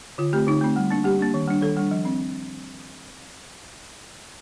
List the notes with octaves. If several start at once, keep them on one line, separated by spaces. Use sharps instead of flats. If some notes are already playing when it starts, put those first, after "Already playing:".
D3 F4
A3 C4 G4
D3 D#4
A3 C4
G3
A#3 D4
G3 G4
A#3 D4
D#3
G3 D4
D#3 A4
G3 D4
F3
C4